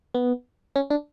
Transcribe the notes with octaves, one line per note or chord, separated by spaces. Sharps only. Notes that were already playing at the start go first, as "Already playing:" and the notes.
B3
C#4
D4